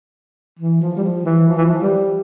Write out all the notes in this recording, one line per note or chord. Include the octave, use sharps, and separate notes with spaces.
E3
F3
G3
F3
E3
F3
E3
F3
G3